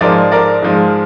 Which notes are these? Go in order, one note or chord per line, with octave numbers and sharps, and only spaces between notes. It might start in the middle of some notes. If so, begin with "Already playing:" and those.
G#2 F3 G#3 A#4 D5
A#4 D5
G#2 F3 G#3